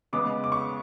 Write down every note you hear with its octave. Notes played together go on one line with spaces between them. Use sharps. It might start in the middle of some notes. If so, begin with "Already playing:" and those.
C#3 G#3 B3 D6
D6
C#6